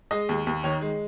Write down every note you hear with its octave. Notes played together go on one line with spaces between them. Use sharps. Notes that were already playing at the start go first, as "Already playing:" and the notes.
G#3 D#5
D#2
D#2
D#3 C#5
G#3